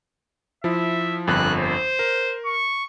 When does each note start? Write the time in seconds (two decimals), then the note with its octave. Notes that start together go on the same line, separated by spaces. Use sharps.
0.64 F3 E4 E5
1.27 G1 F2 F#6
1.59 C5
1.99 A#4
2.46 C#6